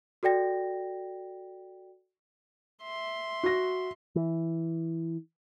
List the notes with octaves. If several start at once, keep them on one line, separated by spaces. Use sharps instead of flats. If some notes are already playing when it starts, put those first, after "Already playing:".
F#4 A4 D5 G5 A#6
E5 C6
F#4 A#6
E3